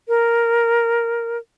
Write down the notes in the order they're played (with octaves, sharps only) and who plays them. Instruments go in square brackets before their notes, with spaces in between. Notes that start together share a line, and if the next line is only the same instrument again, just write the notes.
[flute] A#4